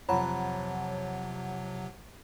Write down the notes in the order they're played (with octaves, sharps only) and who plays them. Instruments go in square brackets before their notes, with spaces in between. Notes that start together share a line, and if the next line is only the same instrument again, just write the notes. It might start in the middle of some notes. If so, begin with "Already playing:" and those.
[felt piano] F2 [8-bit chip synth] C3 F#3 [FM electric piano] C#5 F#5 [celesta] A#5 B5